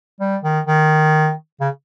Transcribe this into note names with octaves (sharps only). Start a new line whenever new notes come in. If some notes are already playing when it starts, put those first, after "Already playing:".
G3
D#3
D#3
C#3